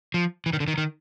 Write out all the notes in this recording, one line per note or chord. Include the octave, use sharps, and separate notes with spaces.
F3
E3
D#3
D3
D#3
D#3